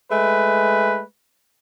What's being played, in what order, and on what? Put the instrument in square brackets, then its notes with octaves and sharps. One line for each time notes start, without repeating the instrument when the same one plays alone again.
[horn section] G#3 A3 B4